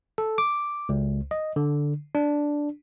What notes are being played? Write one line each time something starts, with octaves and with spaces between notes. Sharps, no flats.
A4
D6
C#2
D#5
D3
D4